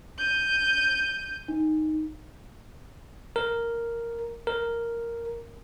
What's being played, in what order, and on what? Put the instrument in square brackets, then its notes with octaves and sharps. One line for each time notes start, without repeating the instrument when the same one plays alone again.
[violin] G6 D#7
[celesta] D#4
[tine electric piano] A#4
A#4